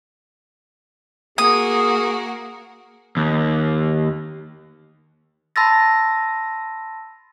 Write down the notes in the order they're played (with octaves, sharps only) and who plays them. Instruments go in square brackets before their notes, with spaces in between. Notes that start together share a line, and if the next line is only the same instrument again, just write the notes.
[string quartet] A#3 F#4 A#4 [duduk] G#4 [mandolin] D#6
[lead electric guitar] D#2
[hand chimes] A5 B5 C6 E6 A6 A#6